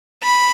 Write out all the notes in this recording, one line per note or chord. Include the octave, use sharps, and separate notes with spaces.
B5